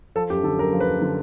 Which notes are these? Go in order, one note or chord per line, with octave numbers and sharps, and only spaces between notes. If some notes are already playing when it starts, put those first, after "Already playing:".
F3 A4
F#2 G4
D3 A4
F#2 A#4
F3
B4
F#2
D3